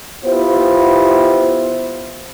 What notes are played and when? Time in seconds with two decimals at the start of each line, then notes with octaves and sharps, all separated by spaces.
0.24 B3 E4 F4 G4 C5